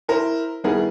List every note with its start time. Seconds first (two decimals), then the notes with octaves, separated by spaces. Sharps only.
0.08 E4 A#4 C5
0.64 D#3 G3 B3 E4 G#4 A#4